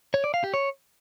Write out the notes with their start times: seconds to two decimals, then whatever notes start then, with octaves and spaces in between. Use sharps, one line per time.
0.14 C#5
0.24 D5
0.34 F5
0.44 G4
0.54 C#5